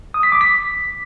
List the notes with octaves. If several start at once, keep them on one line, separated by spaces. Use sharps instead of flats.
D#6
B6
D6
B6